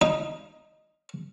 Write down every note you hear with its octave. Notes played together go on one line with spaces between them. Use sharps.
D#4